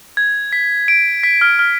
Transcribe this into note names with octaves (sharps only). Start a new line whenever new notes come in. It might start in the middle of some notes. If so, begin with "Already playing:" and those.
G#6
B6
D7
B6
F6
F6